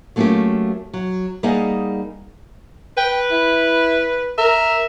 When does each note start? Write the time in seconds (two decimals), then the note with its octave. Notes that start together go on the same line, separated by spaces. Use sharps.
0.16 F#3 A3 A#3 C#4 F4 G4
0.93 F#3
1.43 G3 A#3 D#4 G#4 D#5 F#5
2.97 B4 G5
3.31 E4
4.38 A#4 E5